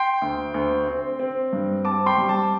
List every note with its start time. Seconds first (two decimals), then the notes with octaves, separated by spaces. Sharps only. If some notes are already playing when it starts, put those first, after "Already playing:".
Already playing: G5 C6
0.22 D2
0.54 D2
0.87 C4
1.20 C4
1.53 G2
1.85 C4 A5 D6
2.06 G5 C6
2.18 G3
2.28 A5 D6